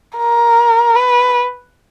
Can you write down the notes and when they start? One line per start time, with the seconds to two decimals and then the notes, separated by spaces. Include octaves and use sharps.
0.17 A#4
0.96 B4